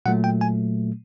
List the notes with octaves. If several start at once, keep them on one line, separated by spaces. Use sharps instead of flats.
A#2 F#3 A3 F#5
G5
G#5